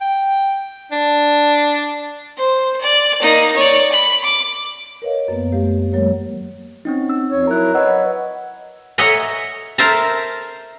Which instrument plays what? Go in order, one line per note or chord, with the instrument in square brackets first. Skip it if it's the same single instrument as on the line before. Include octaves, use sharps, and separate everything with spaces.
[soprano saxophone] G5
D4
[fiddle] C5
D5
A#3 D#4
C#5 D5
B5
D6
[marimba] A#4 B4 C#5 D#5 F5
F#2 A#3 B3
G3 A3 G4 F5
D#3 F#3 G#3 A#3 A#4 C#5
[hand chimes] C4 C#4 D#4
E6
[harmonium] F2 C#5
[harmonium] F#3 E4 A#4 [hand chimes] A#5 F#6
[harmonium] B4 C#5 [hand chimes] D#5 F#5 E6
[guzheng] C#5 D#5 E5 F#5 G#5 A#5
A#4 C5 E5 A5 A#5